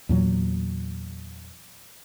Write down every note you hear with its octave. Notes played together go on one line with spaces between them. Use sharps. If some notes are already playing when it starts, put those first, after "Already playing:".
E2 A#2 F#3